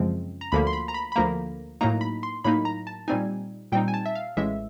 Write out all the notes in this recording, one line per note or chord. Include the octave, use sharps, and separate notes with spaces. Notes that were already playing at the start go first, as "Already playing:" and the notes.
Already playing: F#2 C#3 F3 G#3 C4
A#5
D2 D3 F3 A#3 B5
C6
B5
A#5
B5
B5
D2 D3 F3 A#3 A#5
A2 F#3 A#3 D#4 A#5
B5
C6
A2 F#3 A#3 D#4 B5
A#5
A5
A#2 G3 C4 D#4 G#5
A#2 G3 C4 D#4 G5
G#5
A5
E5
F5
A1 A2 E3 G#3 E5